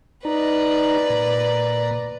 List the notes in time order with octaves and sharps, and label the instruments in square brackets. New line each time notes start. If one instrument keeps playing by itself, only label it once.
[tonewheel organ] D#4 A#5 [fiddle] B4 D5
[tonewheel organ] A#2 A#5